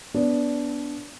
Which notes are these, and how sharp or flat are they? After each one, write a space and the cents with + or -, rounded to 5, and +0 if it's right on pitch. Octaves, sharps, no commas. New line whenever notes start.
B3 +0 D4 -20